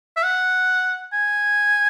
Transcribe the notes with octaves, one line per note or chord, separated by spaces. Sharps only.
E5
F#5
G#5